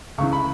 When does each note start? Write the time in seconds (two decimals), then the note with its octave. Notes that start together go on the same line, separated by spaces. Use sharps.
0.18 C#2 C#3 E3 C#6
0.33 B5